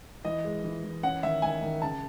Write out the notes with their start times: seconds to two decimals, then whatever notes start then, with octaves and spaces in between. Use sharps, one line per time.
0.25 E3 D#5
0.44 G#3
0.64 E3
0.84 E3
1.03 C#4 F#5
1.23 D#3 E5
1.42 D#3 G#5
1.62 D#3
1.82 C#3 A5